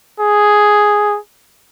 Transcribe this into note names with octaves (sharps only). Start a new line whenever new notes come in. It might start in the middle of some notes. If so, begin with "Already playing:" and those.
G#4